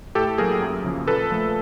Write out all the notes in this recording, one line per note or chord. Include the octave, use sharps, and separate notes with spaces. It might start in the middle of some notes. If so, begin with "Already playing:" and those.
A2 G4 A4
F#3 A#3 G#4 A#4
F#2
C#3 F3 A#3
A#2 A4 B4
F3 A3